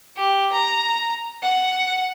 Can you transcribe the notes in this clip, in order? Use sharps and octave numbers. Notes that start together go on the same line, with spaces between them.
G4
A#5
F#5